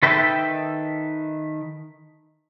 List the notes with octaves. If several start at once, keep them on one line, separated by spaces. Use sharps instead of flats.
D#3 A4 B4 E5 G5